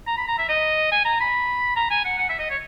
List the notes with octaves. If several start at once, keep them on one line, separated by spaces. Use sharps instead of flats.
A#5
B5
A#5
E5
D#5
G#5
A#5
B5
A#5
G#5
F#5
F#5
E5
D#5
C#5